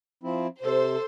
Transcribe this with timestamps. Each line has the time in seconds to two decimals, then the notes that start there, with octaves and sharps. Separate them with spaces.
0.23 F3 C4 E4
0.63 C3 A4 C5